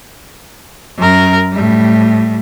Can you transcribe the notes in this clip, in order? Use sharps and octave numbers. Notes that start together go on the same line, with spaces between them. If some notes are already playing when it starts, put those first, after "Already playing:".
F#2 A#4
A2 G3